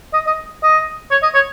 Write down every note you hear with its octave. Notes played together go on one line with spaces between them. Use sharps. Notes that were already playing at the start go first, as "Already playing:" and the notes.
D#5
D#5
D#5
C#5
D#5
C#5